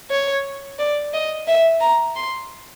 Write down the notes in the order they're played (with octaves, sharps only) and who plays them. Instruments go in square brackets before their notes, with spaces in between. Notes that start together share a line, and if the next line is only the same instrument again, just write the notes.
[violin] C#5
D5
D#5
E5
A#5
C6